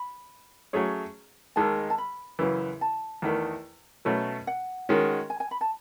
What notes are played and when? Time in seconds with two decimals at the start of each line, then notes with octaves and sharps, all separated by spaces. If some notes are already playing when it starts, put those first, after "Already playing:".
Already playing: B5
0.73 F#3 A3 C#4 G#4 C#5
1.56 D#2 D#3 G#3 A5
1.90 A5
1.98 B5
2.39 F#2 C#3 E3
2.81 A5
3.22 E2 D#3 A3
4.05 B2 F#3 A3 C#4
4.47 F#5
4.89 D#3 G#3 C#4 F#4
5.30 G#5
5.40 G#5
5.51 B5
5.61 A5